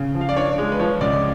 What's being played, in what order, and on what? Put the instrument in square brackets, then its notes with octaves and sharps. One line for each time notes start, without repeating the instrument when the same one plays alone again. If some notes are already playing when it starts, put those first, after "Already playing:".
Already playing: [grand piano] C#3
F3
F5
D5
D4 C#5
G#3
B4
F3 C#5
C#2 D5